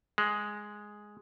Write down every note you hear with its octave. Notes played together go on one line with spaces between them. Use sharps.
G#3